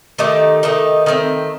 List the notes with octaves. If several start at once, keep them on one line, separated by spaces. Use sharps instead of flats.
D#3 A3 D#4 G4
D#3 A3 D#4 G4
D#3 A3 C4